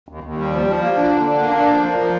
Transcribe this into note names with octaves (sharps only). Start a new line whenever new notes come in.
D#2
D#2
G3
F3
F3
A#3
D4
D3
D4
A#3
D4
F3
A#3
F3